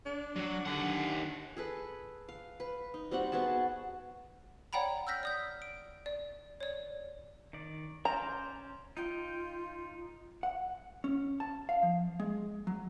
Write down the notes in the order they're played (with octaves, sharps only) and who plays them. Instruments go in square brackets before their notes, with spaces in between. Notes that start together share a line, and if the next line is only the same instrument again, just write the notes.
[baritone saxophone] D4
[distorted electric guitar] F#3
[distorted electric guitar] D#2 F#5 [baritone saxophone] D3
[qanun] G#4 A4 B4
F5
B4
D#4
G3 C4 F#4 F#5
B3 F#4 G#4 A5
[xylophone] C#5 D5 F#5 G5 A#5 B5
E6 F6 G6 A#6 B6
D5 D#6 G6
D7
D5
C#5 D5
[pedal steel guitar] D#3 D5
[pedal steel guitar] C#4 C5 D5 [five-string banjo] A#5
[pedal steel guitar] D#4 G5 [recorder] F4
[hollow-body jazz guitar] F#5
C#4
A5
F5
F3
G#3
F#3